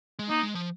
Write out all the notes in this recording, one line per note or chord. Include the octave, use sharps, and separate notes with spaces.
G#3
A#3 D#4
G#3
F3